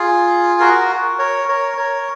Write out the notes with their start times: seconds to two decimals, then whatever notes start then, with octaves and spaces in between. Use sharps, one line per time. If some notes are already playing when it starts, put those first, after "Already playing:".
Already playing: F4 G#4
0.60 F#4 A#4
1.19 A#4 C#5
1.49 A#4 C#5
1.77 A#4 C#5